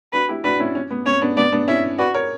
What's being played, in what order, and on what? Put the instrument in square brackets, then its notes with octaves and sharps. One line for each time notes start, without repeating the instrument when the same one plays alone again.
[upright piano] D4 F#4 [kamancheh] B4
[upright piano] E4 G4
[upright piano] D4 F#4 [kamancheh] B4
[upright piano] C#4 E4
C#4
B3
[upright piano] C#4 [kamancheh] C#5
[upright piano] B3 D4
[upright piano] B3 D4 [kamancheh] D5
[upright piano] B3 D4
[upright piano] C#4 E4 [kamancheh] E5
[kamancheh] F#4 [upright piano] B4 D5
[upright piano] A#4 C#5